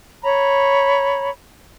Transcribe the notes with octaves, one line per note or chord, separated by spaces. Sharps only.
C#5 A#5 B5